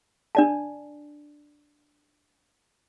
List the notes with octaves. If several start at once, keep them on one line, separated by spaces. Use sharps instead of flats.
D4 D5 A5